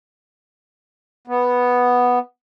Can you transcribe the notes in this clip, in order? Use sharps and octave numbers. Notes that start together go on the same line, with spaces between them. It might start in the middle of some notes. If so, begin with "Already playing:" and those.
B3